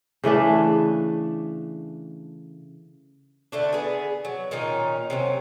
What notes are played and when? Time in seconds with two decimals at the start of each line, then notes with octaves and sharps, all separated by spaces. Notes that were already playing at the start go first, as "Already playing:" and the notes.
0.24 C#3 E3 A3 D4
3.52 D3 A3 D4
3.73 B3 G#4
4.25 F#3
4.51 A#2 D#3 C#4 D#4
5.10 C3 F#3 C#4